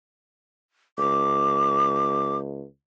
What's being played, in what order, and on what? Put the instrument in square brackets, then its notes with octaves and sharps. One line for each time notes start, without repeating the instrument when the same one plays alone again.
[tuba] C#2 [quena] D6